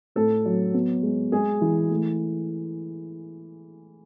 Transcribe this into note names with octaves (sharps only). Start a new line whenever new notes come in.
A2 A4
F#3
B3
G#3
G#3 G#4
E3
A3